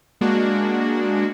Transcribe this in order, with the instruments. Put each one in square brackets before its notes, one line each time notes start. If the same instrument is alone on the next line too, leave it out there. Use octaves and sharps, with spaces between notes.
[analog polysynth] G#3 A#3 D4 F#4